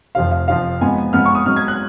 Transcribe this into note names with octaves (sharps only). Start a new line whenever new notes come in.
F1 F2 F3 F5
F5
F1 F2 F3 F5
G#2 F3 B3 G#5
G#2 F3 B3 F6
C#6
D#6
G#2 F#3 B3 F6
G#6
F#6